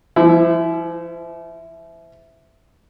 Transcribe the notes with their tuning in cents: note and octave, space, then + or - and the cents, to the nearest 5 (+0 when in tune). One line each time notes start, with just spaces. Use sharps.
F3 -40 E4 +0